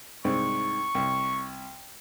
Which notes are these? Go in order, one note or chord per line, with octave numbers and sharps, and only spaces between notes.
C2 G#2 C4 C#6
C2